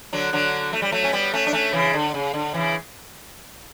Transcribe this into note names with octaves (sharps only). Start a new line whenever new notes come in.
D3 F#3
D3 F#3
A3
G3
F#3 A3
C#4
G3 B3
A3 C#4
D4
A3 C#4
C#3 E3
D3
C#3
D3
C#3 E3